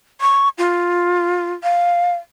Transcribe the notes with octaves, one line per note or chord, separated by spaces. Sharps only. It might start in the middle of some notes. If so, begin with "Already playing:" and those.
C#6
F4
F5